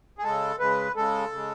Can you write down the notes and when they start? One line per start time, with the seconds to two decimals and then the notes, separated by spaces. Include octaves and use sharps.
0.18 G#4
0.23 C#3 G#3 A4
0.59 C#3 G#3 B4
0.96 C#3 G#3 A4
1.32 C#3 G#3